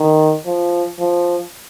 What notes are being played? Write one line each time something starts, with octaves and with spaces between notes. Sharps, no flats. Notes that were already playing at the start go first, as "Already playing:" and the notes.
Already playing: D#3
F3
F3